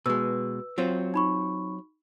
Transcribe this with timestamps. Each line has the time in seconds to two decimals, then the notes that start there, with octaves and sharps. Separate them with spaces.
0.06 B2 G#3 B4 E6
0.78 F#3 C4 F4
1.14 D#4 B5 C#6